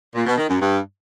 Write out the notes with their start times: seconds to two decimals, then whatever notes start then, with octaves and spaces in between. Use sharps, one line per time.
0.15 A#2
0.26 B2
0.37 D#3
0.49 F#2
0.60 G2